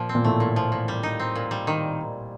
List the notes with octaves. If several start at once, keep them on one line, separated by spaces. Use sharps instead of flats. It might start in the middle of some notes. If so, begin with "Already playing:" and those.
Already playing: A#2 F3
C4
A#2
A2 A3
A#2
F3
A#2
G3
D#4
C4
A#2
G3
D#3